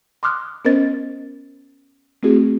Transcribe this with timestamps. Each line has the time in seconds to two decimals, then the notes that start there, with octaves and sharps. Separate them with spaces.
0.23 C6 D6 D#6 F6 F#6
0.65 B3 C#4 A#4 C5 D#5 A6
2.23 A3 C4 E4 F#4 G#4